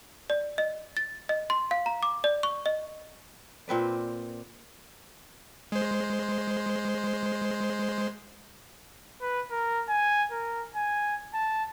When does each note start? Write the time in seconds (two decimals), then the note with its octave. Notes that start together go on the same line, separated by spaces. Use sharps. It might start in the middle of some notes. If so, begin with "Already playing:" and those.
0.30 D5
0.58 D#5
0.97 A6
1.29 D#5
1.50 C6
1.71 F5
1.86 A#5
2.03 D6
2.24 D5
2.43 C#6
2.66 D#5
3.68 A#2 C4 B4 D5
5.72 G#3 C5
9.21 B4
9.51 A#4
9.88 G#5
10.32 A#4
10.75 G#5
11.34 A5